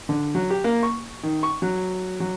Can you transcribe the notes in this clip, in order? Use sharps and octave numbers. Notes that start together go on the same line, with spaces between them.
D3
F#3
G4
A#3
C#6
D#3
C#6
F#3
F#3